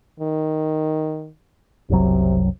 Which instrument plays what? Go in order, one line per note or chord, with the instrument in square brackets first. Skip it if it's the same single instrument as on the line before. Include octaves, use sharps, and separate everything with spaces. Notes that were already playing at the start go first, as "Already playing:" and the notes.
[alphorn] D#3
[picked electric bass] F#1 C2 F#3 [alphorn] C3